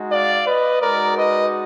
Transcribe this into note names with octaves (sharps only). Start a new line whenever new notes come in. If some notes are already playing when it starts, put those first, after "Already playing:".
Already playing: G#3 D#4 F#4
D5 F5
B4 D#5
G#3 D#4 F#4 A#4 D5
B4 D#5